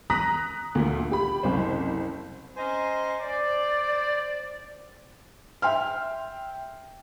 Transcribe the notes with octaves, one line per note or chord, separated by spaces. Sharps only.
A#5 D#6 F#6 A#6 B6
D2 A#2
G4 B5
F#1 C2 C5
C#4 C5 D#5 G#5 A#5 C6
C5 D5
E5 G5 C6 F6